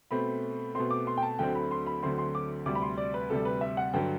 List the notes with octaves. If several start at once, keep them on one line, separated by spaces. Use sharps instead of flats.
B2 A3 C4 B5
B2 A3 C4 C6
D6
C6
G5
A5
D2 D3 F#3 A3 C4 G5
B5
C6
B5
D2 D3 F#3 A3 C4 C6
C6
D6
D2 C3 G3 D6
B5
C6
D5
B4
D2 C3 G3 A4
B4
E5
F#5
G2 D3 F#3 G5